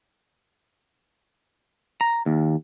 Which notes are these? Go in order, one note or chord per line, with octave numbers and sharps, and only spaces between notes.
A#5
D#2